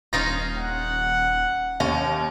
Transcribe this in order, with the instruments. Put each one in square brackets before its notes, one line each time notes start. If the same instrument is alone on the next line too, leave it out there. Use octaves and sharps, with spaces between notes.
[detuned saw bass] D#1 [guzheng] C#4 D#4 F4 [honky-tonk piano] A#6
[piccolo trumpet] F#5
[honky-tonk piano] D#2 [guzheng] C#4